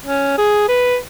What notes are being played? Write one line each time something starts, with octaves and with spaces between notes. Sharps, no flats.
C#4
G#4
B4